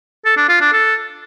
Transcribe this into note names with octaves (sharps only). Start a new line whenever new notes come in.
A4
D4
F4
D4
A4